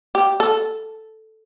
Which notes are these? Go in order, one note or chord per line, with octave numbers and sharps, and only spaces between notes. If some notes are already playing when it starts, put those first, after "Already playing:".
G4
A4